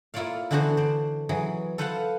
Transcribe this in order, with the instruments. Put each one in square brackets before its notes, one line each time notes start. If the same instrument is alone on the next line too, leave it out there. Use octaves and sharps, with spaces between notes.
[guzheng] A#3 E4 F4 C#5 D5 F5
D3 E3 B3 D4 F#4 C5
C5 D5
E3 F#3 G#4
A4 B4 C5 F5 F#5 A5